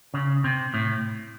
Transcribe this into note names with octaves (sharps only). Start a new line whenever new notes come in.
C#3
C3
A2